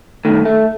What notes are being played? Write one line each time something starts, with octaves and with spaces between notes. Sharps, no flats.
G2 D#3 A3
A3